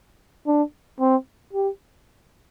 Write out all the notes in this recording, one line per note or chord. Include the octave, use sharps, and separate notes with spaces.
D4
C4
G4